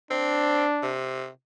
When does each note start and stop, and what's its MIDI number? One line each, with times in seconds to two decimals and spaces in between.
0.11 0.65 60
0.11 0.96 62
0.83 1.28 48